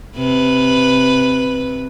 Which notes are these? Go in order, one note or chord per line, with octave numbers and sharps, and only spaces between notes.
C3 B4